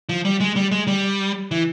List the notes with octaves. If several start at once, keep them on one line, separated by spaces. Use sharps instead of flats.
F3
G3
G#3
G3
G#3
G3
E3